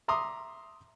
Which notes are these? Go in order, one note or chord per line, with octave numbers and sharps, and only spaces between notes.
E5 A#5 C6 D6 D#6